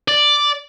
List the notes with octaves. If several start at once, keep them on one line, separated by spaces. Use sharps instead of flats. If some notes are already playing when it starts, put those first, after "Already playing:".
D5